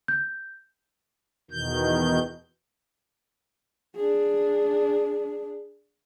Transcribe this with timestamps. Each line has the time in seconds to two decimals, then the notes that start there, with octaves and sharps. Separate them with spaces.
0.08 G6
1.51 E2 B2 D#3 G6
3.96 D4 G#4